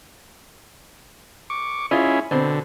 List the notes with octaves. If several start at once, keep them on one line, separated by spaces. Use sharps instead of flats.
C#6 D6
G#2 C#4 E4 F4 D#5
B2 D3 C4